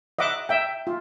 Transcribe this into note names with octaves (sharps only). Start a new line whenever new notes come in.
D#5 E5 F#5 D6
E5 G5
F4